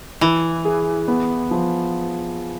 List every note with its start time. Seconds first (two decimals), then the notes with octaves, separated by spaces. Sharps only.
0.21 E3 E4
0.65 G#4
1.08 B3
1.51 F3